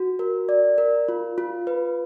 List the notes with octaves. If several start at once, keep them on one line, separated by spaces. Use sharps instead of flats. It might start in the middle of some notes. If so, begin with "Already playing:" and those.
Already playing: F#4
A#4
D5
A#4
F4
F4
B4